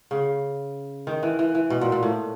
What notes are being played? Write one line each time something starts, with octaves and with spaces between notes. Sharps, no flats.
C#3
D#3
E3
E3
E3
B2
A#2
A#2
A2